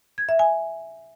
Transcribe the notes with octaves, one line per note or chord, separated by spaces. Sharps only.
G#6
E5
G#5